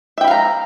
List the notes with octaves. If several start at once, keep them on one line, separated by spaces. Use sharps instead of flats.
E5 F5 G5 A#5 B5